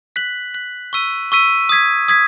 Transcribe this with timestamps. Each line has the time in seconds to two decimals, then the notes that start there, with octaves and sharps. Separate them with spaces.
0.16 F#6 B6 F#7
0.54 F#6 B6 F#7
0.93 C#6 E6 B6 D#7
1.32 C#6 E6 B6 D#7
1.69 D#6 G#6 B6
2.08 D#6 G#6 B6